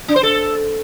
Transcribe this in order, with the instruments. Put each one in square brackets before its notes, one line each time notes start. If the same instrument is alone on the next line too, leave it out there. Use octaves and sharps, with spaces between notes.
[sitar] D4
C5
A4